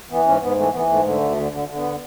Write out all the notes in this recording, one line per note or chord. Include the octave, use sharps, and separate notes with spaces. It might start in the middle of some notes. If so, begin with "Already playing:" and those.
E3 B3
G#2 C#4
G#2 B3
E3 A3
E3 B3
G#2 A3
D3 A3
D2
D3
D3
D3
B3